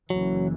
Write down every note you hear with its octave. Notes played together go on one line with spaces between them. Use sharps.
F#1 F#2 E3 F#3